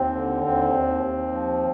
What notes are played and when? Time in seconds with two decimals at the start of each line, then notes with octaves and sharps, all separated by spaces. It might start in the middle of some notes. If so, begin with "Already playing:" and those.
Already playing: D#2 C4
0.14 D3
0.44 D#2 C4
0.73 D#2
1.03 D#2
1.32 F3